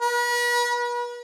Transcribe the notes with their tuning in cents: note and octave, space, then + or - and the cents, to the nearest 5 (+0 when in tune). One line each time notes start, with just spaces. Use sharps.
B4 -40